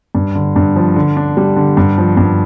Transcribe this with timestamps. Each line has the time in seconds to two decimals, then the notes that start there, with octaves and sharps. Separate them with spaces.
0.15 G2
0.35 D3
0.56 G2
0.76 F3
0.96 D3
1.17 D4
1.37 G3
1.56 D3
1.77 G2
1.98 F3
2.17 G2